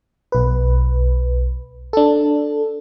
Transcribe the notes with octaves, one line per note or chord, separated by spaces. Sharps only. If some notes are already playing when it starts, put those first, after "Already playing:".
B1 B4
D4 A4